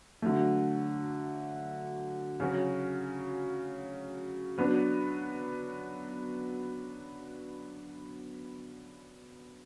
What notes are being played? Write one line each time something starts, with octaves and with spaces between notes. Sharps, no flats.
D3 F#3 A3
C#3 F#3 C#4 F#4
F#3 B3 D4